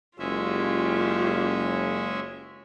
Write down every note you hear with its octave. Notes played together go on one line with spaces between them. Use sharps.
F#1 G#3 C#4 F4 G4 E5